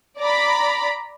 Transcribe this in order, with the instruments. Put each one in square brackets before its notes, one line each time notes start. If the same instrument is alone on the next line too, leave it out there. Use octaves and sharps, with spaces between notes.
[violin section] D5 A#5 B5